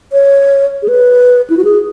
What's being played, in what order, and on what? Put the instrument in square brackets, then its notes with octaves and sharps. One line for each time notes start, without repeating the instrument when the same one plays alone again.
[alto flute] C#5
G#4
B4
E4
F#4
G#4